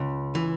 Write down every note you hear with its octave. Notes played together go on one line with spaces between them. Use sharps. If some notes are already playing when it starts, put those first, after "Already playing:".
Already playing: C#2
E3